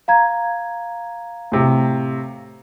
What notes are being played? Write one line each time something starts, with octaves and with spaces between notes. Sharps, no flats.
F5 A#5 G#6
A2 C3